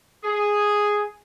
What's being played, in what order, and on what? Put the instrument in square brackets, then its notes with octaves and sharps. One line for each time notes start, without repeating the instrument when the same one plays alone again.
[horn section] G#4